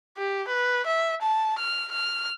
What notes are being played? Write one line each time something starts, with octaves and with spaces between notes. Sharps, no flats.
G4
B4
E5
A5
F6
F6